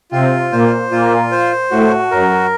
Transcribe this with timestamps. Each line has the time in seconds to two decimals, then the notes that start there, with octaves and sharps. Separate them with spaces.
0.11 C3 C4 F4
0.52 A#2 A#3 C5
0.91 A#2 A#3 F4
1.31 C5
1.71 A2 A3 F#4
2.11 F#2 F#3 A#4